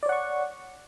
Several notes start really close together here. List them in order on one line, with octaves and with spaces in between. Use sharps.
D5 C#5 F#5 C#6